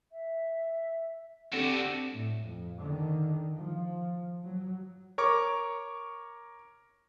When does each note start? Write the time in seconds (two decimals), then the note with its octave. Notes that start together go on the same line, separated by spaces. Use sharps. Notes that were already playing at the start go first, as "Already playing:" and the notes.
0.11 E5
1.53 D3 C4 F#4 G4 A4 D5 A#6
2.11 A2
2.45 F2
2.78 D3 D#3
3.56 F3
4.44 F#3
5.18 A#4 C#5 C#6 D6